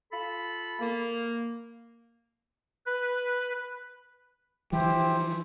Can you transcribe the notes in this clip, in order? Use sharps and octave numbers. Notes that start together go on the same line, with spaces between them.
F4 A4 B5
A#3
B4
E3 F3 E4 G4 C5